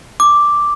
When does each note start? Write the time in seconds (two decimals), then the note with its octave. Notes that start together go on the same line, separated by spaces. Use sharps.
0.20 D6